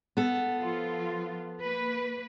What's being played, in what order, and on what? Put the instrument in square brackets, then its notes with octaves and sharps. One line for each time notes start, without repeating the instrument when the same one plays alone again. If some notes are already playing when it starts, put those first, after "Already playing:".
[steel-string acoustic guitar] B3 A4
[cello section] F3 F4
A#3 B4